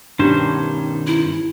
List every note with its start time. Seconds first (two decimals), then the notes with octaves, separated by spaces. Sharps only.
0.19 G2 B2 D#3 C#4 D4 G4 C5
1.07 E4